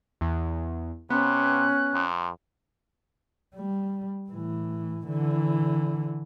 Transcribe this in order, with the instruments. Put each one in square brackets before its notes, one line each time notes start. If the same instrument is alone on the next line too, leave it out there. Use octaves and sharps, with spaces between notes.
[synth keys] E2
[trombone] C3 [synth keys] B3 [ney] C#4 [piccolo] F#6
[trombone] F2
[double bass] G3
A2 E3
D3 E3